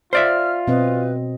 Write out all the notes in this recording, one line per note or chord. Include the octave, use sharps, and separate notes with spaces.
F4 C5 D5 E5 F6
B2 C4 B4 D#5